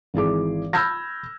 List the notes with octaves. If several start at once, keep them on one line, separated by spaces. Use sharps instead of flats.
G#1 E3 G#4 D6
B5 E6 F6 G6 G#6 A#6